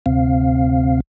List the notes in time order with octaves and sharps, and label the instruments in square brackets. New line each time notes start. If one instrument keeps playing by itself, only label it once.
[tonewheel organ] D2 C3 C4 F5